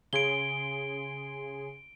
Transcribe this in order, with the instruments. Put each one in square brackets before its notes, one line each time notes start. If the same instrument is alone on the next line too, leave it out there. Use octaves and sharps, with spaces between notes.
[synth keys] C#3 G#4 C6 [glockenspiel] D7 G7